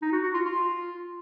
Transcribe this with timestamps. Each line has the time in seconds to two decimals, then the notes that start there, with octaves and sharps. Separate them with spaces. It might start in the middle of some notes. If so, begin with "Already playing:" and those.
0.02 D#4
0.12 F#4
0.23 F#4
0.34 F4
0.45 F4